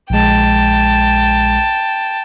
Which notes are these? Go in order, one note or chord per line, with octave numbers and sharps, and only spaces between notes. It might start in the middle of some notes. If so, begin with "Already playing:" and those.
A#1 G#3 G5 A5